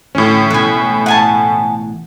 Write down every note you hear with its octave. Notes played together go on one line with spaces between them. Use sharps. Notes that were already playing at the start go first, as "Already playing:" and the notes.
D2 A2 E3 C#4
A1 B2 E3 B4 G#5
F#5 G#5 A5